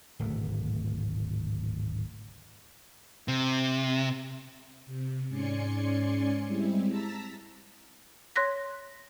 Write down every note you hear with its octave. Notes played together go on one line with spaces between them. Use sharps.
D1 G#1 B2 A3
C3
C3
G#2 C#4 D5 G#5 C6 C#7
G3 G#3 C4 E4
A5 A#5 E6 A6 B6
C#5 C6 F#6 A#6 B6